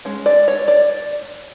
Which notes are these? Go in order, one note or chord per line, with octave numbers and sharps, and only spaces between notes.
G#3 C#4
D5
C#5
D5